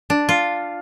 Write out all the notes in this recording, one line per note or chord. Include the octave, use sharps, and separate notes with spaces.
D4
F4